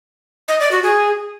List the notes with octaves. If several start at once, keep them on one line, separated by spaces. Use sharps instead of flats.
D#5
D5
F#4
G#4